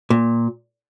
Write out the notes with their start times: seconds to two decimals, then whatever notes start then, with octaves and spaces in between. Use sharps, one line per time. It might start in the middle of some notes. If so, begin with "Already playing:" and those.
0.10 A#2